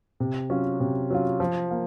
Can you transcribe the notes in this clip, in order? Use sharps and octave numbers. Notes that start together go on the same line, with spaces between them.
C3
F#3 C#4 F4
C3
F#3 C#4 F4
F3
A#3